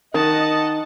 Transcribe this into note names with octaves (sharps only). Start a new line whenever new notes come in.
D#3 D#5 F#5 A5